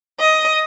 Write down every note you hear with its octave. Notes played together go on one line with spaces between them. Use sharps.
D#5